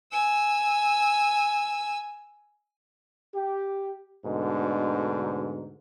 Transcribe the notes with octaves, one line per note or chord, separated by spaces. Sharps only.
G#5 E6
G4
D2 G#2 B2 D3